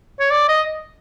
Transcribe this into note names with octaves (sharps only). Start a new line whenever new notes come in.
C#5
D5
D#5